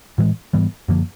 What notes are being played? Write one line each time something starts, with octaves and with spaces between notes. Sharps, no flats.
A2 E3 G#3
G#2 E3 G3 B3
F#2 D3 F3 A#3